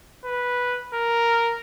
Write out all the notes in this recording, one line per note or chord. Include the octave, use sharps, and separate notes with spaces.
B4
A#4